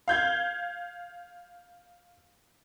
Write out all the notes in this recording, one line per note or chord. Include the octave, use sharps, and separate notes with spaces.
F5 G6 G#6